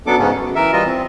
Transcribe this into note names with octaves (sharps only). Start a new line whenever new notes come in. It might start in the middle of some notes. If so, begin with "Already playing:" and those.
F#2 F#3 B3 D4 A4 D6
G#2 C#3 B3 C#4
F#2
E3 A#4 E5
E3 G3 F4 D#5
C4